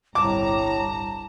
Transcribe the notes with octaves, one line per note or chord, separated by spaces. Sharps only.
G1 C2 A2 A5 A#5 D6